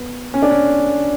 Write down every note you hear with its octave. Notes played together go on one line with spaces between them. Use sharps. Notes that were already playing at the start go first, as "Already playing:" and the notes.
Already playing: B3
C#4
D4
C#4